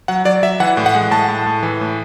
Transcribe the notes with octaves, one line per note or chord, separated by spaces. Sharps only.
F#3 F#5
F#3 D5
F#3 E5
E3 F#5
A2
F#5
G#3
A2 A5
A2
A2
E3
A2